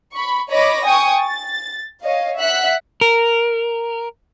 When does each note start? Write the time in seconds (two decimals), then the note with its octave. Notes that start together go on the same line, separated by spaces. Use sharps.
0.13 B5 C#6
0.50 C#5 D#5 B5 D6 A#6
0.85 G5 G#5 C#6 D#6
1.21 A6
2.04 C#5 D#5 F5
2.39 E5 F#5 F#6 B6
3.01 A#4